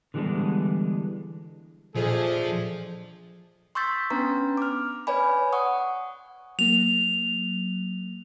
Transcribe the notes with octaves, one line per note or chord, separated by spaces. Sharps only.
D3 E3 G3 G#3 B3 D4
F2 A#2 F3 A3 D4 G#4
C6 C#6 E6 G6 A6 B6
B3 C#4 D4 B4 A#5
D6 F6
B4 C#5 D5 G#5 B5
F#5 C#6 D#6
F#3 A#3 F7